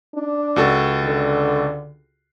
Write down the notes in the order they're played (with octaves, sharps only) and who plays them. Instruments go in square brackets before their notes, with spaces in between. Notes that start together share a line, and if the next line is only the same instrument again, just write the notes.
[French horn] D4
[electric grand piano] C#2 F#4 A4
[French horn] D3